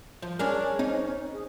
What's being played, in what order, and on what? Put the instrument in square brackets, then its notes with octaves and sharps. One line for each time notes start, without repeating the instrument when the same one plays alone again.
[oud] F3
[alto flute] C#4 [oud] D4 G#4 A#4
[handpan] C4 [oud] D#4
[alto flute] G#4